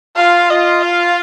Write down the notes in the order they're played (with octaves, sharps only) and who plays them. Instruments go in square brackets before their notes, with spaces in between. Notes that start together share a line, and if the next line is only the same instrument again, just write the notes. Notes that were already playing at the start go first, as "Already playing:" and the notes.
[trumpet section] F4 [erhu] F5
[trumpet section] F4 [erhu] D#5
[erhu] F5